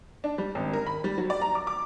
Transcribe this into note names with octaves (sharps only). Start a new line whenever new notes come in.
D4
G3
G#1
A#4
B5
G3
F#3
D5
A#5
D6
D6